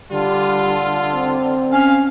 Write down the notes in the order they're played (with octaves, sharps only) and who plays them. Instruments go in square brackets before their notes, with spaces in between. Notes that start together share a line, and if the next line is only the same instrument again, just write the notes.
[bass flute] D3 [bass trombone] G3 [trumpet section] F4
[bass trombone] C4
[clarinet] C#4 [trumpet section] F5